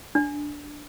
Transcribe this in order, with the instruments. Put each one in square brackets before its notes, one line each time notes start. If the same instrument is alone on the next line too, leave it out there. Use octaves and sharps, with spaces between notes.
[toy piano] D4